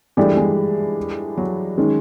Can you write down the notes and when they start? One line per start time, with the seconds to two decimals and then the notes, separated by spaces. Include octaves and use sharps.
0.17 G2 E3 G#3 A3 D4 G4
0.37 G#3
1.37 F#3
1.78 D#3 G#3 C#4